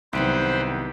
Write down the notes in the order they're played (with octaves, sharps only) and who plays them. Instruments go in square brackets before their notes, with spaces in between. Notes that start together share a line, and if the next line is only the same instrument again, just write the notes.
[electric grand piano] C2 [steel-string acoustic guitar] D#3 F#3 B3 [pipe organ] B4 C5 G5